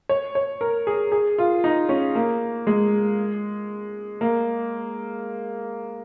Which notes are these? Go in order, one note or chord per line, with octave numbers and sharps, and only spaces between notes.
C#5
C#5
A#4
G#4
G#4
F4
D#4
C#4
A#3
G#3
A#3